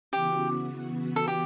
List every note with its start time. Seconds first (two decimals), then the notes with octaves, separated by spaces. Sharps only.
0.13 C#3 E3 B3 F#4 G4
1.16 A4
1.28 G4